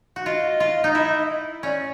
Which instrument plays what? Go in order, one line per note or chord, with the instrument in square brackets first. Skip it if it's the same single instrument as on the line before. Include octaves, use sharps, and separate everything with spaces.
[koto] F#4
[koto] F4 [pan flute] D#5
[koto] F4
D#4
E4
[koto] C#4 [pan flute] D5